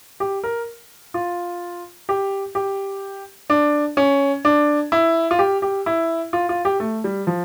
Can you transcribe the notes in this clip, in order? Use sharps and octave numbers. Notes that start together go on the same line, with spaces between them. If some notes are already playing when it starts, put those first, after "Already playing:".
G4
A#4
F4
G4
G4
D4
C#4
D4
E4
F4
G4
G4
E4
F4
F4
G4
A3
G3
F3